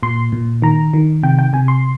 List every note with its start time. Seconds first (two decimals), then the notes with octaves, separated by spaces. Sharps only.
0.03 A#2 C6
0.32 A#2
0.62 D#3 A#5
0.93 D#3
1.23 C3 G5
1.39 G5
1.53 C3 G#5
1.68 C6